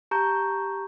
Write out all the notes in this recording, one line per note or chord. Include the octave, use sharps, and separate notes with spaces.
G4 A5 A#5 C#6 G6